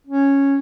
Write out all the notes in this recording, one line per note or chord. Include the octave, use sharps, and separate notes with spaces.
C#4